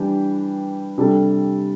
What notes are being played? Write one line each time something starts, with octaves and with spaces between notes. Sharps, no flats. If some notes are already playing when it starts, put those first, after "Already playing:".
Already playing: E3 G3 D4 G4
C3 G3 D4 A4